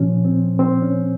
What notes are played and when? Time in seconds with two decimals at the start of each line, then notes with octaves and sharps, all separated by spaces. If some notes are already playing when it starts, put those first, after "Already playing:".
Already playing: A#2 F3 C#4
0.25 C4
0.59 C4
0.82 C#4